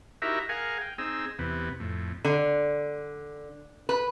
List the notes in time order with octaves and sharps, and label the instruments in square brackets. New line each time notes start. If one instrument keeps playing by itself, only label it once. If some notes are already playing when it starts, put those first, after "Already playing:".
[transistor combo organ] D#4 E4 F#4 G4 A#4 E5
G#4 A#4 F5 F#5 G#5
G5
C4 D#4 G#4 E6
E2 C3 B3
F2 A2
[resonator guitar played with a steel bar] D3
B4